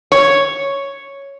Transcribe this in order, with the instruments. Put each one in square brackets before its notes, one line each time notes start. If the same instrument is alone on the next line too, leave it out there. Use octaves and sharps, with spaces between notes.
[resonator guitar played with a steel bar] C#5